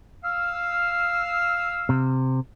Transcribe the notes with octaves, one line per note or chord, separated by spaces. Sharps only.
F5 E6 F6
C3